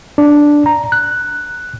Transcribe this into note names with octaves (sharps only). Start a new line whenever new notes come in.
D4
A#5
F#6